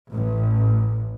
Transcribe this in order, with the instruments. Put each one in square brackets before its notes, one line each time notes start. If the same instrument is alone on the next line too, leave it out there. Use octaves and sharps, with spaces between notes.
[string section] A1